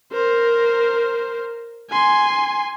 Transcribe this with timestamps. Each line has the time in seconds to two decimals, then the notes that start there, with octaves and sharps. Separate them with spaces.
0.13 A#4 C5
1.90 G#5 C6